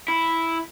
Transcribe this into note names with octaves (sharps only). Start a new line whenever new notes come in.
E4